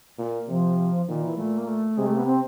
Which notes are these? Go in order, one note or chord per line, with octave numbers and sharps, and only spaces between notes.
A#2
C3 F3
A#2 D#3
E3
A#2 A3
A#3
A3
C3 G#3
A3
B3
C4